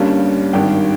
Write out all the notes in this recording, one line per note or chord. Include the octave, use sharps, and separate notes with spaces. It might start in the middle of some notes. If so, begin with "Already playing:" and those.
Already playing: G1 G2 G3 A#3 C#4
G#1 G2 D#3 G5